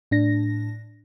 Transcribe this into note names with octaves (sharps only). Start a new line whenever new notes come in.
A2 D4 A#6